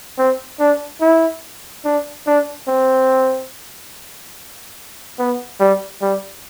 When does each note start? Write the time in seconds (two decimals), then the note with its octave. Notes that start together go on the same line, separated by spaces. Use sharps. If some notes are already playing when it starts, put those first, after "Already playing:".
0.18 C4
0.59 D4
1.01 E4
1.85 D4
2.27 D4
2.68 C4
5.19 B3
5.60 G3
6.02 G3